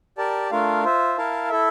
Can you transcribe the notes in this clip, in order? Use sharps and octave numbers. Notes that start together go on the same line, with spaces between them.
G4 A#4 D5 A5
A3 D4 F4 A#4 F5
F4 C5 E5
E4 A#4 F5 A5
E4 A4 E5